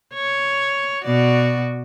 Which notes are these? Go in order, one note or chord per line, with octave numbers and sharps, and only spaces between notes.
C#5
B2 F#4 D5